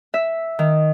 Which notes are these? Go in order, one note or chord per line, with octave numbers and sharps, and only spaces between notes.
E5
D#3